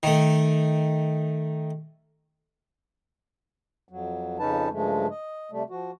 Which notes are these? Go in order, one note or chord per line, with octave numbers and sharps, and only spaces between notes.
D#3 A3
F2 F#3
F2 C#3 C#4 D#4 B4 A5
G2 C#3 F3 G#3 A3
D#5
C3 G3 A3
F3 F#4